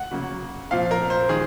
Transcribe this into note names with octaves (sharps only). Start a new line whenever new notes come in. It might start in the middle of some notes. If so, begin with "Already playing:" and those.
Already playing: F#5
C#3 F#3 A#3
A#2 F3 C4 F5
A#4
C5
D#3 G#3 G#4